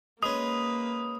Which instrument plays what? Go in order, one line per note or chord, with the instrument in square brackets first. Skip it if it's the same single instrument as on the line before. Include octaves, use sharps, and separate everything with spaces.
[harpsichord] G#3 C#4 [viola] A#3 [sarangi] B4 [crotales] D#6